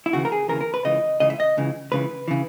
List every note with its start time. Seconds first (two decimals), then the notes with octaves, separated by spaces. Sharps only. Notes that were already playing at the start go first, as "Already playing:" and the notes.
0.06 E4
0.13 D#2 C#3 E3 F#4
0.25 A#4
0.32 G#4
0.48 D#2 C#3 E3 A#4
0.61 A#4
0.74 B4
0.85 C#2 C#3 E3 D#5
1.20 C#2 C#3 E3 D#5
1.30 E5
1.40 D#5
1.57 C#2 C#3 E3
1.92 C#2 C#3 E3 B4
2.28 C#3 E3